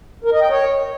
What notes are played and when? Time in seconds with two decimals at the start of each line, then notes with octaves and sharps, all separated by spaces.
0.24 A#4
0.33 D#5
0.41 G5
0.50 C#5